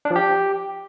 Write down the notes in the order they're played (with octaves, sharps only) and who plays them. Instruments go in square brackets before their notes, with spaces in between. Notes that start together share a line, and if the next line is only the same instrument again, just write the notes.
[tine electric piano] D4
F3
G4